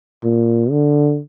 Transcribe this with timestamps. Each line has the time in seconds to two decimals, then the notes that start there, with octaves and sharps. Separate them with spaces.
0.24 A#2
0.70 D3